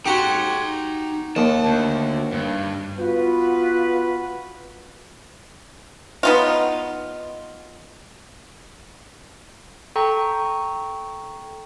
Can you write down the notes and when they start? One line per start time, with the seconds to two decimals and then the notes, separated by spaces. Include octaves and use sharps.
0.06 D#4 F#4 G4 C6
1.36 D#2 A5
1.66 D2
2.32 G2
2.99 B3 F4 F#4 B4
6.23 B3 D#4 F4
9.96 A4 G5 A#5 C#6